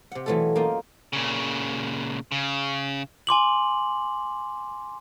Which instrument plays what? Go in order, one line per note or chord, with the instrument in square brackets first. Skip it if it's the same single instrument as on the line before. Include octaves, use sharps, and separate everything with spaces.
[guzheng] C3 F#5
B2 E3 F#3 A3 F4 A4
F#2 A#3 F4 D#5 F5 G5
[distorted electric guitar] A#2 C#3
C#3
[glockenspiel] G#5 C6 D6 F#7